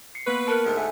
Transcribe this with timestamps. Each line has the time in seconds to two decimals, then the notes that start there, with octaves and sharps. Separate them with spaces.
0.15 C7 C#7
0.26 A#3 B3 B4 C#6
0.48 A#4 A5 F#6 C#7
0.65 D2 G#2 A3
0.77 A4 E5 G#5